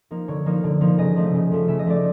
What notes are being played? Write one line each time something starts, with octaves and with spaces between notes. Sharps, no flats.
F3 A#3 D#4
D3 C#5
F3 A#3 D#4
D3
F3 A#3 D#4
C#3 D#5
F3 A3
C#3
F3 A3
C#3 E5
D#5
F3 A3 D5